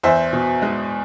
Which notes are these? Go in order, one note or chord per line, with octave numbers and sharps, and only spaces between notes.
E2 C5 E5
B2
G#3